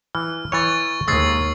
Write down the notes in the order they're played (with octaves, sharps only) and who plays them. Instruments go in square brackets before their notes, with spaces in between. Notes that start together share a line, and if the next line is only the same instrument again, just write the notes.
[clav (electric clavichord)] E3 [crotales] F6
[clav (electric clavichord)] E3 C#5 [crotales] C#6 A6
[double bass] D#2 [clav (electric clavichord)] G#3 [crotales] E6 A6 C7